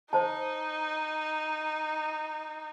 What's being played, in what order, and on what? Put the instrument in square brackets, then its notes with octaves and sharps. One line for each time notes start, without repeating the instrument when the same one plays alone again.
[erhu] D#4 [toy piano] C5 A5